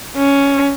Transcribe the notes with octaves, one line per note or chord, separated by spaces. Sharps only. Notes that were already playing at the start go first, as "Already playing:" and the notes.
C#4